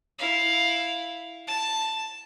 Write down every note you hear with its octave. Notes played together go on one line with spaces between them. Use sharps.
E4 F5
A5